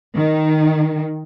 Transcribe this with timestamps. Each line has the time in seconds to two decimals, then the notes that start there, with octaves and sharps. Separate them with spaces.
0.16 D#3